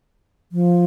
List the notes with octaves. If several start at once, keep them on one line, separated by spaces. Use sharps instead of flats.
F3